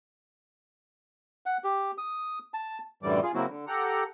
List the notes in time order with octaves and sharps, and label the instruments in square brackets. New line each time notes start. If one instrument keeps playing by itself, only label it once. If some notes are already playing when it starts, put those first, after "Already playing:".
[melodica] F#5
G4
D#6
A5
[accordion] F#2 A2 D3 E3 G3 D5
F4 G#4
C#3 F#3 A#3 C4 E4 F#4
D3
G4 A4 F#5 A#5